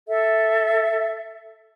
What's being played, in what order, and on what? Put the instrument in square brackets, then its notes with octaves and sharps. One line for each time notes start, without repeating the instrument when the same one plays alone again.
[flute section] A4 E5